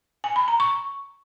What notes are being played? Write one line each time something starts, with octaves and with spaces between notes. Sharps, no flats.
G#5
B5
A#5
C#6